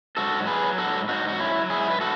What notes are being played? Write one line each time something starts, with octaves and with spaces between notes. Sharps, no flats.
G#2 F#4 A4
F#3
G#4 B4
F#3
F#4 A4
G#2
G#2 D#4 F#4
F#3 F#4
C#4 E4
F#3
E4 G#4
G#2
B4
F#4 A4